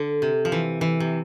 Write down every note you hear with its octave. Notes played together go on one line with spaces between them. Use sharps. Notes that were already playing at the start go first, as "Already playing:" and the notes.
Already playing: D3
C3
F3
E3
E3
C3